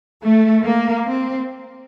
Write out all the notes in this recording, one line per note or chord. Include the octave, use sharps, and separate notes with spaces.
A3
A#3
C4